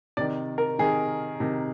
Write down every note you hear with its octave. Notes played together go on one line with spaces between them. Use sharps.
C3 D#3 D5
A#4
C3 D#3 G#4
C3 D#3